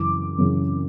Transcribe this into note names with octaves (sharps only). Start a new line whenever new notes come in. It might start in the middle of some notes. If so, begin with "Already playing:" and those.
Already playing: F#2 C#3 E3 D6
F#2 C#3 E3